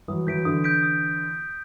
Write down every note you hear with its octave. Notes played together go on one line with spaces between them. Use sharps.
E3 F#3 D#6
E3 F#3 G6 B6 D7
D3 E3 D#6
G6 B6 D7
D#6